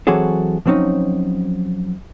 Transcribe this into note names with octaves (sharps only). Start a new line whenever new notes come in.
E3 F#3 C4 F#4 G#4 A4
F3 F#3 C4 C#4 D#4